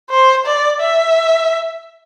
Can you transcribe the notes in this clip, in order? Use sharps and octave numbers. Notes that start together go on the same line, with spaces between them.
C5
D5
E5